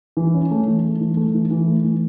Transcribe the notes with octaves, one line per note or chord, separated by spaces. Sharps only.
E3
C#4
A3
E3
A3
E3
A3
E3
E3
A3
E3